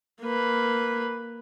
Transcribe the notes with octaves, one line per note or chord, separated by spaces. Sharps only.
A#3 B4